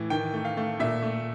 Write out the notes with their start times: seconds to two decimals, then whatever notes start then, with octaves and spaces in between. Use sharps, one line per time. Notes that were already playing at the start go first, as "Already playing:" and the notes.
Already playing: A2 E3
0.10 D#3 G5
0.34 A3
0.45 F5
0.57 A3
0.80 A#2 E5
1.02 A3